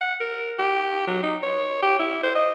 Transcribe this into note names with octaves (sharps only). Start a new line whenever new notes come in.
F#5
A#4
G4
F#3
D#4
C#5
G4
E4
C5
D#5